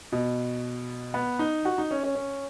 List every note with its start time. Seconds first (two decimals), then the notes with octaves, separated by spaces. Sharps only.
0.12 B2
1.14 B3
1.39 D#4
1.65 F#4
1.78 D#4
1.91 C#4
2.03 C#4
2.15 C#4